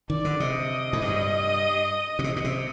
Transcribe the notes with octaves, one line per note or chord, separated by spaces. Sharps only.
D#3 D5
D3
C3 D#5
A2
G2
A#2
C3
A#2
C3